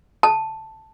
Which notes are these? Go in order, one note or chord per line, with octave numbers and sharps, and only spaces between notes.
A5